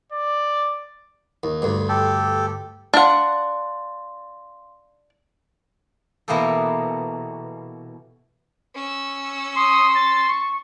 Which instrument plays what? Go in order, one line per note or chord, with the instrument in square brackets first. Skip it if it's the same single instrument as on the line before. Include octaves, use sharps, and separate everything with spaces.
[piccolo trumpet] D5
[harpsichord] D#2
D2 G2
[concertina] G4 A4
[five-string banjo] D4 F#5 [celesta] F5 C6
[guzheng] B2 E3 A#3 B3 G4 A4
[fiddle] C#4 E6
[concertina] C6 [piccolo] D#6
[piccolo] A6
C#6